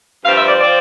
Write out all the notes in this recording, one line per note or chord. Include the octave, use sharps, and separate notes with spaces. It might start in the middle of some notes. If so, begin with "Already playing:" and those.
G2 F3 C4 F5
E5
D5
F3 C4 D5